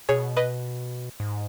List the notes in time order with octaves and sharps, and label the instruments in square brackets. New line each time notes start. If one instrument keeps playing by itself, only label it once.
[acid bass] B2 [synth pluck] G#4 C#5
[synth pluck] B4 D#5
[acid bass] G#2